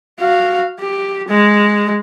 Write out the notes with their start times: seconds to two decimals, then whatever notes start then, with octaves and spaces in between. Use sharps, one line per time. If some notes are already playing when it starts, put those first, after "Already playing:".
0.20 F#4 F5
0.80 G4
1.28 G#3